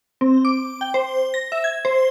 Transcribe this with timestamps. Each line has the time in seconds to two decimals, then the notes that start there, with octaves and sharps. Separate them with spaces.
0.21 C4
0.45 D6
0.81 G5
0.94 C5
1.34 A#6
1.52 E5
1.64 G#6
1.85 C5